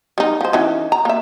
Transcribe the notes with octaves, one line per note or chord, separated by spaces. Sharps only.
G3 D#4
F3 C5
D#3 E3 C#4
A#5
A#3 E5